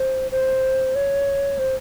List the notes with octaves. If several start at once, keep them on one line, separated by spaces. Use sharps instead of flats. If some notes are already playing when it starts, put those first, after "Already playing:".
Already playing: C5
C5
C#5
C5